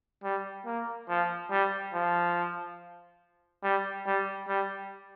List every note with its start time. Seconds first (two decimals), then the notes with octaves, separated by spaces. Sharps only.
0.24 G3
0.66 A#3
1.09 F3
1.51 G3
1.94 F3
3.64 G3
4.07 G3
4.48 G3